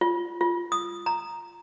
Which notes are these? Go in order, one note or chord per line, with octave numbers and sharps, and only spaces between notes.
F4
F4
D#6
A#5